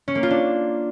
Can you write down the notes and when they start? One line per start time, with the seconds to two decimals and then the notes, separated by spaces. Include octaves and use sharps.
0.08 C#4
0.15 A#3
0.23 F4
0.30 D4